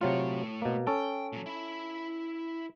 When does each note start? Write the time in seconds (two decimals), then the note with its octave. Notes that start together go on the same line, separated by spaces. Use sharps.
0.01 C3 F#3 A3 F4 C#5
0.62 B2 A#3
0.87 C#4 A4 G5
1.33 A#2 F#3
1.46 E4 B5